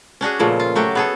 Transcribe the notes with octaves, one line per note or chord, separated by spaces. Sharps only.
C#4 D4 F#4 G#4
A#2 C#3 F3 A3
F4
F#3 A3 F#4 G4
B3 G#4 A4